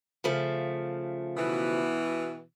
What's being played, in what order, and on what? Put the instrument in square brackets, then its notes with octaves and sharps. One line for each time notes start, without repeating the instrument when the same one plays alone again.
[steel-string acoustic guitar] C#3 F3 A3
[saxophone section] B2 E3